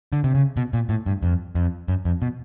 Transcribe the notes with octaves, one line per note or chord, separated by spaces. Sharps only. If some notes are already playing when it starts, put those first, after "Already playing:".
D3
C3
C#3
B2
A#2
A2
G2
F2
F2
F#2
F2
B2